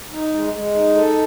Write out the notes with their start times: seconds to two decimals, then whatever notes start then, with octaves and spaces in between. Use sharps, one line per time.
0.12 D#4
0.33 G#3
0.54 G#3
0.75 D#4
0.96 A4